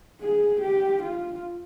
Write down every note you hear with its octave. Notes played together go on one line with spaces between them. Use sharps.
G#4
G4
F4